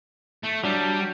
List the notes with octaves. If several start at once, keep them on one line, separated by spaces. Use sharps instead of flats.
A3
F#3 G3 D4